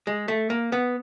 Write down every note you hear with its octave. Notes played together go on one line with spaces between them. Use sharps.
G#3
A3
A#3
B3